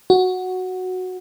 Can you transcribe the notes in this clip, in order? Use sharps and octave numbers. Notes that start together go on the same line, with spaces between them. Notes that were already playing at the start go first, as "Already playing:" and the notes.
F#4